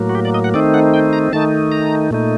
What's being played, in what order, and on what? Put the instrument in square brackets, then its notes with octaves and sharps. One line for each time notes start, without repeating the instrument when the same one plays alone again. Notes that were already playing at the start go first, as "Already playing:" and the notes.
Already playing: [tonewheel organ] A2 F#3 A#3
F#4
G4
D5
D#5
F#5
D#3 A3 C4 D#4 D5
F#5
G5
A#5
D#3 A3 D#4 A5
A#5
A#2 A3 D#4